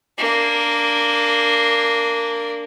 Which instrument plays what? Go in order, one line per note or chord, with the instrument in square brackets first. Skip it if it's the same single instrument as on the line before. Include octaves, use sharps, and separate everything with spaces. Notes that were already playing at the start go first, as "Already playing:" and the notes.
[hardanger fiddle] A#3 D4